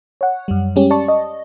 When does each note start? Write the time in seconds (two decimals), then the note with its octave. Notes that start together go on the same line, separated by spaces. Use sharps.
0.21 C#5 F#5
0.48 F#2 G3
0.76 G3 G#3 C#4 G4
0.90 D5 A5 C#6
1.08 D#5